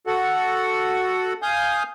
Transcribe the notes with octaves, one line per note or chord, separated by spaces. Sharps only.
F#4 A4 F#5
F5 G#5 D#6 G6